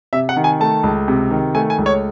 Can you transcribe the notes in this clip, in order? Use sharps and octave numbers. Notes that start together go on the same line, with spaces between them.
C3 E5
F#5
D#3
G#5
A3 A5
C#2
C3
D#3
A3 G#5
G#5
C#2
C#5